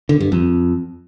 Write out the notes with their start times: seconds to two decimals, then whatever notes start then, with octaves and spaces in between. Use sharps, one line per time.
0.09 D3
0.20 G2
0.32 F2